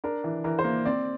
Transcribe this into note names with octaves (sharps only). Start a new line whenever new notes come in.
D4 A#4
E3
E3 A#4
C5
A#3
C4 D5